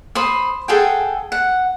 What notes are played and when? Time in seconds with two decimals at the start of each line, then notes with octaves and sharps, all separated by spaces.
0.15 C5 B5 D#6
0.68 G#4 A4 F#5 G5
1.32 F#5